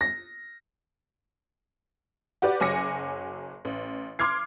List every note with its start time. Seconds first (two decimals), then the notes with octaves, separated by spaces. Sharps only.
0.01 A#6
2.42 F#4 G4 B4 D5
2.60 F#1 F#3 G#5 D6 A#6 C#7
3.65 A1
4.19 C6 D6 F6 G#6 C7